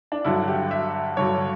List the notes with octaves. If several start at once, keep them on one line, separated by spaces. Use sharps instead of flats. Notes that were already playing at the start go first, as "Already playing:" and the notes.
D4
G2 D3 F#3 E4
G4
E5
G2 D3 F#3 C#5